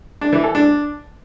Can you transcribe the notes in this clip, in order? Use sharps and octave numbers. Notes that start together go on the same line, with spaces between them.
D4
E3
A4
D4